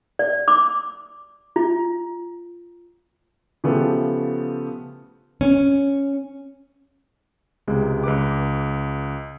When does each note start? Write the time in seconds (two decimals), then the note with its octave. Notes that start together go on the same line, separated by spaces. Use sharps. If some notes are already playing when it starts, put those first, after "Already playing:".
0.19 D5
0.48 D6
1.56 F4
3.64 C#3 F3 A3 B3 G4 A4
5.41 C#4
7.67 C#2 C3 G#3
8.04 C#2 B4 D6